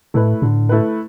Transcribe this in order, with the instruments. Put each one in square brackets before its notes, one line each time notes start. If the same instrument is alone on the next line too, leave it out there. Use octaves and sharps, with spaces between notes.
[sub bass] A2 [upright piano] A3 E4 B4
[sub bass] A2 [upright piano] D3
[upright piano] A3 E4 B4